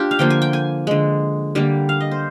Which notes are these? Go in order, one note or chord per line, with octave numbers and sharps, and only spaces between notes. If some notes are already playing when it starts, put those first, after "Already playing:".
Already playing: D4 F4 G4
F5
D3 F3 A#3 G5
G#5
G5
G#5
D3 G#3
D3 G3 A#3
F5
D#5
C5